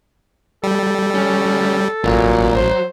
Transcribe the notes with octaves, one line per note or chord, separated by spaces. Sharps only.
G3 A4
D2 C#4
A1 A#2 F#3
C5